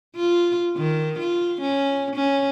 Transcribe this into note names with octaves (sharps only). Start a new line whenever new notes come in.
F4
D#3
F4
C#4
C#4